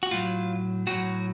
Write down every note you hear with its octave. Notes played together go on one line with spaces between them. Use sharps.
F#4
A2 F#3 F4
A2 F#3 F#4